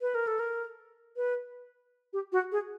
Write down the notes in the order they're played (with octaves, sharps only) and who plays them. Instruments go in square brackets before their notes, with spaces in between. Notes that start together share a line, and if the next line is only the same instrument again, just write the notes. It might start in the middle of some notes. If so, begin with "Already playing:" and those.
[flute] B4
A#4
A4
A#4
B4
G4
F#4
G#4